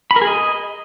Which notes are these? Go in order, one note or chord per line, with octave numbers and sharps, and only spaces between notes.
B5
A#4
G#4
D#5